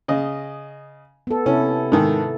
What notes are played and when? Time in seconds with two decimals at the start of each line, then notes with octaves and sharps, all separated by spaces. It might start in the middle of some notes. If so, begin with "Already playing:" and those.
0.08 C#3 D#5
1.27 B3 A4
1.46 C3 C#4 E4 A4
1.92 G#2 D#3 A4